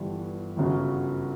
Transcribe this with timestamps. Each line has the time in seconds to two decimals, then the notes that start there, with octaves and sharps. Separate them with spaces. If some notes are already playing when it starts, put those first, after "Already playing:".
Already playing: G1 G2 E3
0.57 G1 F#2 C#3 F#3